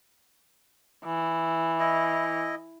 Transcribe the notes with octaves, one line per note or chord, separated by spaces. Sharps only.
E3
E4 D#5